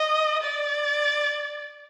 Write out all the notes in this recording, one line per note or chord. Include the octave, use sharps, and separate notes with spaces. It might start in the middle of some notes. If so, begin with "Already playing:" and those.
Already playing: D#5
D5